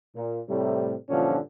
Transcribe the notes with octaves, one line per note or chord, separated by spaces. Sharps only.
A#2
A2 C3 G3
G2 A#2 D3 E3 F3 C#4